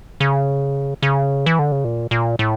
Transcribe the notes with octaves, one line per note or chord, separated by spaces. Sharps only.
C#3
C#3
E3
D3
C#3
A#2
A#2
A2